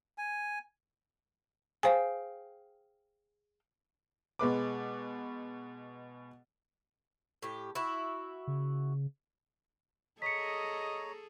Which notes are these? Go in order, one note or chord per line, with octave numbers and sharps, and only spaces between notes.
G#5
G#4 C5 F5 G5 G#5
B2 G#3 B4 D6
A2 G4
E4 F#4
C#3
G#4 A4 C#5 D#5 A#5 B6 C#7